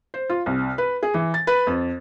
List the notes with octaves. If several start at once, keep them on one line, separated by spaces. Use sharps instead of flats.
C5
F4
C2
B4
G#4
E3
A6
B4
F2